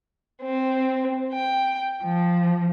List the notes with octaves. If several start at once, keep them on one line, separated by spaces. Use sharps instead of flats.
C4
G5
F3